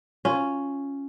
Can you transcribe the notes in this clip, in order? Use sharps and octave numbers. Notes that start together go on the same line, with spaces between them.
C#4 F4